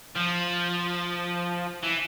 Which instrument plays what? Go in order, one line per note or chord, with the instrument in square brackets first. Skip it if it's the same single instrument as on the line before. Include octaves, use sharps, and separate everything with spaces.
[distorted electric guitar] F3
E3